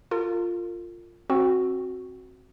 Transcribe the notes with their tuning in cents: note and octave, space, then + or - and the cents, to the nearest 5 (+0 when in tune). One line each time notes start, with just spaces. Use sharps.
F4 +0 A#4 -40
C4 +20 F#4 +0